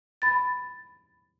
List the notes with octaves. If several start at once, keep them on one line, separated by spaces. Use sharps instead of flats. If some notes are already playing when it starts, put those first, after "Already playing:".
B5 A6